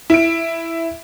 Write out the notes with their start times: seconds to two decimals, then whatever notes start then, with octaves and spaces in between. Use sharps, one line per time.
0.10 E4 D7